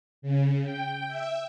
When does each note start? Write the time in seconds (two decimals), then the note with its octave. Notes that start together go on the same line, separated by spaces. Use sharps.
0.22 C#3
0.62 G5
1.07 E5